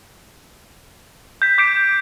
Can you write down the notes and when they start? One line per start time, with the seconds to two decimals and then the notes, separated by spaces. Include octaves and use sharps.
1.42 G6 B6
1.58 D6 G6 C7 D7